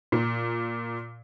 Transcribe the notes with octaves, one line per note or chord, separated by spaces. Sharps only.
A#2